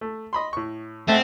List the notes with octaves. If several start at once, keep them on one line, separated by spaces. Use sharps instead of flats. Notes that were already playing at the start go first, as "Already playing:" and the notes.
A3
D#5 B5 C6
A2 C#6
G#1 A3 C4 F#5